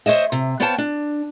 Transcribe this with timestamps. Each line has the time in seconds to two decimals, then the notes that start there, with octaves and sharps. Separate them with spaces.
0.06 C5 C#5 D#5 E5
0.32 C3
0.60 B3 C5 C#5 F5 G5 A5
0.78 D4